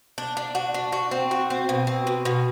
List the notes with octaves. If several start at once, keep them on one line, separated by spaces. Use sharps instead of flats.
D4
D4
F#4
D4
F#4
C4
F#4
C4
B2
C4
B2
B2